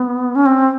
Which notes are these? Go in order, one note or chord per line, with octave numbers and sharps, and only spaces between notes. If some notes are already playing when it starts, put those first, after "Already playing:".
Already playing: B3
C#4
C4